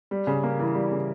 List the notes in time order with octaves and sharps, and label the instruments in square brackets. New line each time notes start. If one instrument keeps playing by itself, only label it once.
[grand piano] G3
C#3
A#3
E3
G3
C#3